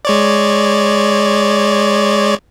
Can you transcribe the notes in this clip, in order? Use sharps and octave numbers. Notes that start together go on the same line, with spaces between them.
G#3 C#5 D5